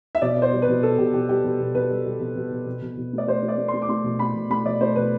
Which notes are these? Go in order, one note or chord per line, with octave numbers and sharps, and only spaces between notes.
E5
B2 D5
B3 C5
G3
B4
B2
B3 A4
B2 G4
B2 G4
G3 G4
B2
B2
B2 B4
G3
G3
B2
B2
B2
B2
B2
B2
A3
D5
A3 C5
A3
D5
A3
C6
A3
D6
A3 C6
B2
A3 B5
B2
A3 B5
B2 D5
A3 C5
B2 B4